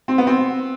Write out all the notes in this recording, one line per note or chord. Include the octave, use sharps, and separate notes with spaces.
C4
B3
C4